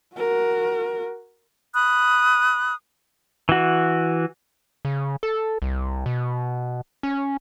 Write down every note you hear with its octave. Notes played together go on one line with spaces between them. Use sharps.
F#4 A#4
B5 D#6 F#6
E3 F#4
C#3
A4
C2
B2
C#4